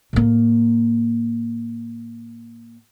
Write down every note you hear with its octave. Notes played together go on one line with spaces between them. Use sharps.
A2 A#3